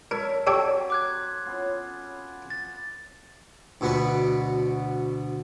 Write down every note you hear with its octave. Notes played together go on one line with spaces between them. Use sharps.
A4 A#4 C#5 E5
F#3 C4 G4 A4 C#5
D6 F#6 G#6
B3 C#4 F4
A6
D2 B2 B3 F#4 B4